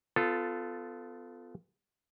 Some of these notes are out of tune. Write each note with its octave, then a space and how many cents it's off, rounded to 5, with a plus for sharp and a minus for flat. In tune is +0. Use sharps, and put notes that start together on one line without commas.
B3 +35 F4 +0 A4 +0